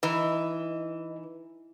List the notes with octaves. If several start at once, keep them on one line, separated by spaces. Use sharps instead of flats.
E3 D#4 B4 D#5